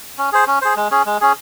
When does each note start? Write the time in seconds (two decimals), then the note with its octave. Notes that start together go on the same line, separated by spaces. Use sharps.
0.18 C#4
0.32 G#4 C5
0.47 C#4
0.62 G#4 C5
0.76 G#3
0.91 C#4 G#4
1.06 G#3
1.21 C#4 G#4